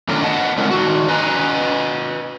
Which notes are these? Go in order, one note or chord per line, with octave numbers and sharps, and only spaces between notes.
F#2 D3 D#3 A3 F4 A#4
D#5 F#5 A5
G#3 C4 E4 A#4
D#3 F#4
B4 D#5 G#5 A#5